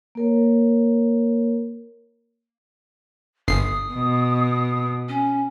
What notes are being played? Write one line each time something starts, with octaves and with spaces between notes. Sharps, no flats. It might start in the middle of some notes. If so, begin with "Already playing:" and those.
A#3 A#4 C#5
G1 D#6 C7
B2
C#4